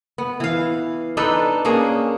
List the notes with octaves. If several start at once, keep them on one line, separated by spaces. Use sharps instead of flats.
B3
E3 F5
D4 D#4 A4 B4
A#3 C#4 D4 G#4